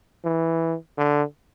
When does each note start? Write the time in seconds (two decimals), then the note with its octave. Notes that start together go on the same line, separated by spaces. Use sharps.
0.24 E3
0.97 D3